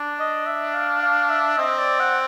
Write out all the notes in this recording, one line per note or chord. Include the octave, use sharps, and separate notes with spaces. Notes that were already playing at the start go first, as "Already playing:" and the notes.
Already playing: D4
D#5
E5
F5
F5
E5
C4 D#5
D5
F#5